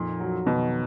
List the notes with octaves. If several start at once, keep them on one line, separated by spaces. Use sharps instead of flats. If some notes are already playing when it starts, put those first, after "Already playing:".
Already playing: F2 A#2 D#4
F#3
B2 D#3